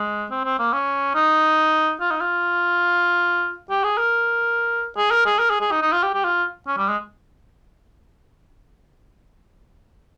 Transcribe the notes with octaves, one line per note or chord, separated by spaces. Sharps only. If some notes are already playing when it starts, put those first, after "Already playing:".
Already playing: G#3
C4
C4
A#3
C#4
D#4
F4
D#4
F4
G4
G#4
A#4
G#4
A#4
G#4
A#4
G#4
G#4
D#4
D#4
F4
G4
G4
F4
C#4
G3
G#3